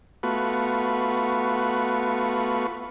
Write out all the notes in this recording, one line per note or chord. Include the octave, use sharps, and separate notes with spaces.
A3 B3 F4 F#4 B4 C#6